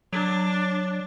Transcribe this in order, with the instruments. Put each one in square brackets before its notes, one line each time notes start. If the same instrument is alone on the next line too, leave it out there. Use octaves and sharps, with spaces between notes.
[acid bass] F#3 [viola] D4